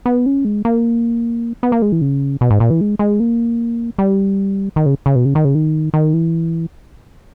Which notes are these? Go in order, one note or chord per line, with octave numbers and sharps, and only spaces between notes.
B3
C#4
G#3
A#3
B3
A#3
G#3
E3
C#3
B2
G#2
A#2
E3
G#3
G#3
A#3
G3
D#3
C#3
C#3
B2
C#3
D#3
C#3
D#3
D#3
E3